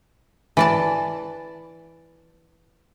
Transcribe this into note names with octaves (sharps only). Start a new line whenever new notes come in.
E3 D5 A5